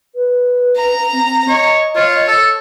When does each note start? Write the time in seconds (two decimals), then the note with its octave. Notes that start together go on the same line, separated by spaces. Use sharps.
0.15 B4
0.77 A#5
1.13 C4
1.49 C#5 D#5
1.96 F4 C#5
2.28 A4